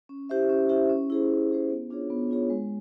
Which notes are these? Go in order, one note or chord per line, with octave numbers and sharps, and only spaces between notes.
C#4
E4 G4 C5 E5
C#4
E4 G4 C5 E5
C#4
E4 G#4 C5
C#4
E4 G#4 C5
B3
D4 F4 G#4 C#5
B3
D4 F4 G#4 C#5
G#3